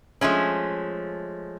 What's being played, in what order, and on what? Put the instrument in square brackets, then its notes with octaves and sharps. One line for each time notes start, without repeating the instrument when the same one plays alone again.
[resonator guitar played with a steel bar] F3 G#3 A3 C#4